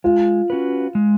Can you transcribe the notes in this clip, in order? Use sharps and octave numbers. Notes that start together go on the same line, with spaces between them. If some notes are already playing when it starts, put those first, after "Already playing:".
G#3 F4
C#4 F#4 B4
G#3